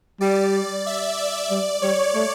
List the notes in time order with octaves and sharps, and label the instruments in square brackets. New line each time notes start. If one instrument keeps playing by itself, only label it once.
[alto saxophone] G3 [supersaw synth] D5
[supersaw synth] E5
D5
[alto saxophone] G3 [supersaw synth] D5
[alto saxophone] G3 [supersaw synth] C#5
[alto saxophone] A3